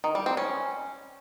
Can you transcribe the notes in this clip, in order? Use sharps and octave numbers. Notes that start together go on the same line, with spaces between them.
D#3
G3
C4
C#4